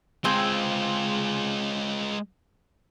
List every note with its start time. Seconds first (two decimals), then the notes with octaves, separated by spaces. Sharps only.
0.24 G#3 C4 F4 G#4 G5